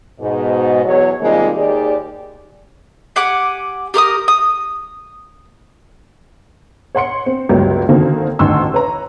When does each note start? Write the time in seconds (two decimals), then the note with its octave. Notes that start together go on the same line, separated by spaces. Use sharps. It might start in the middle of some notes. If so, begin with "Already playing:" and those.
0.20 G#2 B2
0.84 E2 F#3 C#5
1.21 C3 D#3 G3 G#3 A#3 F4
1.56 D#2 D#3 G4 G#4 D5
3.16 G4 F#5 G#5 D6
3.94 G4 A#4 D6 D#6
4.28 D#6
6.95 C#5 F#5 C6 C#7
7.26 C4
7.49 G1 C#2 F#3 A#3 G4
7.89 D3 D#3 A#3 C4 F#4 A4
8.39 A1 D2 D#3 C6 C#6 E6
8.74 B4 C#5 A#5